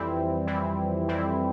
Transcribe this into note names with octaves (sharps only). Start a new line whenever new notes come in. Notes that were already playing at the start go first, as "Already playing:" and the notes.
Already playing: F2 E3 G3 C4 E4
F2 E3 G3 C4 E4
F2 E3 G3 C4 E4